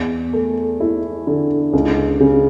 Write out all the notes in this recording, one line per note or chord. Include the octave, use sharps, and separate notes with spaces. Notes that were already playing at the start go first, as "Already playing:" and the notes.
Already playing: E2
A3
E4
D3
C#2
C#3